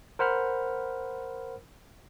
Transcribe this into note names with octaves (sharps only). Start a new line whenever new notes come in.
A#4 C5 F#5 B5 F6